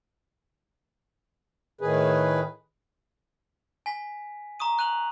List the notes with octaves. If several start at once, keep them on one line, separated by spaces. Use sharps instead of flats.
A2 D#3 G#4 B4
G#5 B6
A#5 C#6 D#6 D#7
C#6 F#6 D#7 F7 F#7